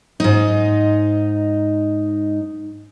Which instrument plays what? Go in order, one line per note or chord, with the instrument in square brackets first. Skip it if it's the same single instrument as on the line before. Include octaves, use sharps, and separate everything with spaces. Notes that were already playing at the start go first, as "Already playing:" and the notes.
[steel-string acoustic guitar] G#2 D#4